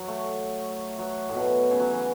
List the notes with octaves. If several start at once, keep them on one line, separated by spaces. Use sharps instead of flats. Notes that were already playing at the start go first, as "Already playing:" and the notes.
Already playing: F#3
A3
F#3
A2
B2
C#3
F#3
E3